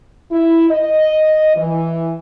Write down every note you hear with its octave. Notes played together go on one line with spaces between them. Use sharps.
E4
D#5
E3